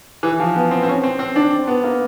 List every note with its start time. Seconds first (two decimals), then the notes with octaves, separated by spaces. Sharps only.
0.23 E3
0.40 F3
0.56 B3
0.71 C4
0.83 C4
0.88 C#4
1.03 C4
1.19 C4
1.36 D4
1.67 B3
1.84 A#3